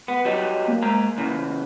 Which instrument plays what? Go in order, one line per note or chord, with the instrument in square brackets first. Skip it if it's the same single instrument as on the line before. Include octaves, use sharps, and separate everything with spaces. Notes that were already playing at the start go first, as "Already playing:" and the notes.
[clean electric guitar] B3
F#3 G3 D#4
[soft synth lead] A#3
[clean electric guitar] G#3 A#5
C#3 E3